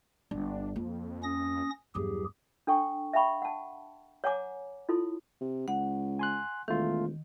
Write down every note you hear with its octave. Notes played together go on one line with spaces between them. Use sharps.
G1 D4
F2 A#3
C#4 D#6 A#6
E2 G2 F#3 G4 G#4
D4 A4 G5 C#6
E5 F5 G5 B5 C#6
F#5 A5
C#5 F#5 G#5 A#5 D6
E4 F4 A4 C6
C3
C#2 F#5
G#5 C6 F#6
E1 D#3 A3 F4